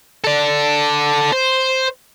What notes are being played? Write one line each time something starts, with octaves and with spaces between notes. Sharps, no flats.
A4 D5
C5